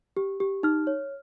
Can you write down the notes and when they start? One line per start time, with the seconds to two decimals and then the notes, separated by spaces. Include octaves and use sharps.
0.17 G4
0.40 G4
0.63 D#4 F6
0.87 C#5